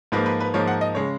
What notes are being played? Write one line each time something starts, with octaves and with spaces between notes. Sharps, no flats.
G#2 F3 A#3 B4
B4
B4
G#2 F3 A#3 C#5
F#5
D#5
C#3 G#3 C#5